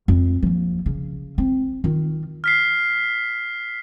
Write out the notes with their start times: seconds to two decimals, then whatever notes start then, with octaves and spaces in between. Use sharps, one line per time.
0.08 F2
0.43 F3 A#3
0.86 C#3
1.38 C4
1.84 D#3 F4
2.44 F6 B6 C7